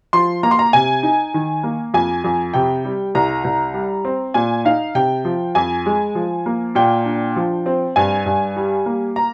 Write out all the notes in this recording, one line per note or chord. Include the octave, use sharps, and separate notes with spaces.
F3 C6
A#3 A#5
C6
A#5
C3 G#5
D#4
D#3
A#3
F2 G#5
F2
C3 G5
G3
C2 A#5
C2
G3
C4
A#2 G#5
D#4 F5
C3 G5
F3
F2 G#5
G#3
F3
A#3
A#2 G5
D4
F3
C4
G2 G#5
G2
G3
A#3
A#5